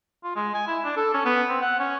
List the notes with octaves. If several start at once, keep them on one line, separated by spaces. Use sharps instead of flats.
F4
G#3
G#5
E4
D4
A4
C#4
B3
C4
F#5
C#4